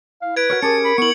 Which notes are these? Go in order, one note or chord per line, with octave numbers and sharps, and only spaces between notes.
E4 F5
B4 G#6 D7
F#4 A#4 C#5
C#4 G4 G#4 A#4 A5 C#7
B5
B3 E4 C#6 C#7 F#7